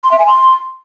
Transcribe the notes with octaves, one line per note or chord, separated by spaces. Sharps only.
C6
E5
G#5
C6